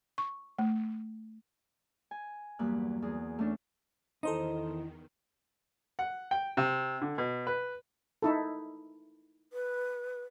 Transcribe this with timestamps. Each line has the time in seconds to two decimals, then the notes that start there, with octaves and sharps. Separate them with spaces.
0.18 C#6
0.59 A3
2.11 G#5
2.59 E2 G2 F#3 A#3 B5 F#6
3.02 E2 G#4
3.39 A3 C#4 D4
4.23 E2 D#3 D#4 E4 A4 C5 D#5
5.99 F#5
6.31 G5
6.57 C3
7.02 D3
7.18 B2
7.47 B4
8.22 D#4 E4 A4
9.53 B4